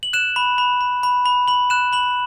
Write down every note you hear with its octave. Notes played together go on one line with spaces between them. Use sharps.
F#7
F#6 E7
B5
B5
B5
B5
B5
B5 F#7
F#6 E7
B5 F#7